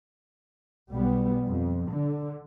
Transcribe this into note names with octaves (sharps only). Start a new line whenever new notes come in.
B1 G3 B3
F2
D3